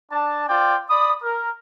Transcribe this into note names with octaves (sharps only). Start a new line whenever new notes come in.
D4 A5
F4 C5 D5 G5
D5 B5 D#6
A#4